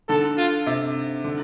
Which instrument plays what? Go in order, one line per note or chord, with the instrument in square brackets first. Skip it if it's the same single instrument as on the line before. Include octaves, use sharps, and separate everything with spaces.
[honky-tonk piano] D3 [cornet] A4
[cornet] F4
[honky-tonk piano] C3
D3